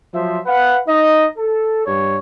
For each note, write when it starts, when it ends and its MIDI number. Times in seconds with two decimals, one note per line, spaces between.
0.14 0.40 53
0.14 0.40 54
0.14 0.40 72
0.14 0.40 76
0.46 0.78 71
0.46 0.78 77
0.46 0.78 78
0.87 1.25 63
0.87 1.25 75
1.38 1.83 69
1.86 2.18 43
1.86 2.18 73